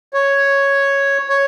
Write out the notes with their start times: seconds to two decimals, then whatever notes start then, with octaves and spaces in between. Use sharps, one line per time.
0.14 C#5
1.29 C#5